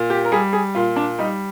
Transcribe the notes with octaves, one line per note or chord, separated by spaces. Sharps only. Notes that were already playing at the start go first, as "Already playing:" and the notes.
Already playing: A#2
G4
A#4
G3 G#4
G#4
A#2 F4
D4
G3 D#4